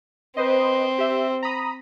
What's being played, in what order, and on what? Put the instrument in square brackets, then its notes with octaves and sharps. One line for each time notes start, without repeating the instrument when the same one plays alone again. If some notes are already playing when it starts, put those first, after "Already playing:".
[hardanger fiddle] C4 [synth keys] B4 C5 D#5
[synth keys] G4 E5
A#5 B5 D#6